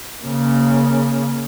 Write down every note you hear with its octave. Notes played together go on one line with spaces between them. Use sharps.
C#3 A#3